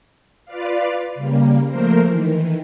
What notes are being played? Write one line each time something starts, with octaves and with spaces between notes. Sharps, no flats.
F4 B4 D5 F5
C#3 G3 A#3
F3 A3 A#3 A#4 C5
D#3 E3